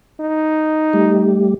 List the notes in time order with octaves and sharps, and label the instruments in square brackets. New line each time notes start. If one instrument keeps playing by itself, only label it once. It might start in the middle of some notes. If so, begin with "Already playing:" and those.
[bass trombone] D#4
[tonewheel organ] G3 A3 G4